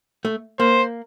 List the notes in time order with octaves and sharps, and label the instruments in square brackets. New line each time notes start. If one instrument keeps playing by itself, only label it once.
[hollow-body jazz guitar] A3
[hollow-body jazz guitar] A#3 [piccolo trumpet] C5